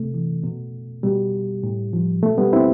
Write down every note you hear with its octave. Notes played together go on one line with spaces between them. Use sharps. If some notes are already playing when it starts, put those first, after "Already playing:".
Already playing: C3 A3
E3
B2
B2 G3
A2
F3
B2 A3
G3 B3
C4 E4